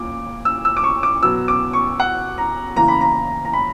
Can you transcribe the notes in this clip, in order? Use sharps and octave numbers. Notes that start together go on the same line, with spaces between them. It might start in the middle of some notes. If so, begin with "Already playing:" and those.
Already playing: A#2 A#3 D6
E6
E6
D6
C#6
D6
B2 F#3 B3 E6
D6
C#6
F#5
A#5
C#3 E3 A#3 A#5
B5
A#5
A#5
B5